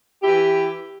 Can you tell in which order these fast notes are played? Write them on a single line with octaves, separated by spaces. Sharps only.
G4 E4 E3